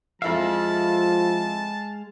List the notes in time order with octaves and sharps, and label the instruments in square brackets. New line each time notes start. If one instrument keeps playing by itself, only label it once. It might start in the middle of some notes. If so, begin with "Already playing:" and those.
[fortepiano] F2 E4 E5 [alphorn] F3 [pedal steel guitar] G#3 F5 [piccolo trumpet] A5